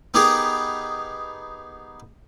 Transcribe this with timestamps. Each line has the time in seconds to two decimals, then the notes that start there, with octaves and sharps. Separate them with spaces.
0.14 B3 D#4 G4 G#4 A#4